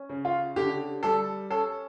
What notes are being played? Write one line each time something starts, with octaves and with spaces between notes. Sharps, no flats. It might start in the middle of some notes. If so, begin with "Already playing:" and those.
Already playing: C#4
C#3
F4
D3 G4
G3 A4
C#4 A4